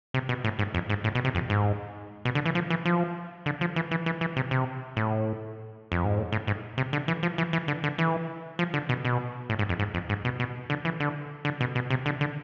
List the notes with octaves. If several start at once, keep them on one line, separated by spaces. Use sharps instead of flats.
C3
B2
A2
G#2
F2
G#2
A2
B2
C3
F2
G#2
B2
D3
E3
F3
E3
F3
D3
F3
E3
E3
E3
E3
C3
C3
A2
F2
G#2
A2
A2
G#2
C3
D3
E3
F3
E3
E3
D3
D3
E3
F3
D3
B2
B2
A2
G#2
F2
G#2
F2
G#2
B2
B2
D3
E3
D3
D3
B2
B2
C3
D3
D3